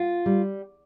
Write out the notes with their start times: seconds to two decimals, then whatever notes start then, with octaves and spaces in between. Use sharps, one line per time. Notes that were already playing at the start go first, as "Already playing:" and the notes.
Already playing: F4
0.26 G3